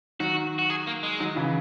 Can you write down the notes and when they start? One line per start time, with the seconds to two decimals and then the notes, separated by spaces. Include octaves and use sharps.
0.20 D#3 F#3 F#4
0.59 F#4
0.70 G#4
0.87 A#3
1.03 G#3
1.20 D#3 F#3
1.36 C#3 E3